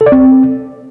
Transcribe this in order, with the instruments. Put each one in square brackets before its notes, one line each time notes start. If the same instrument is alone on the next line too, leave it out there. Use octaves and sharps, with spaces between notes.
[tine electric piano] A4
D5
C4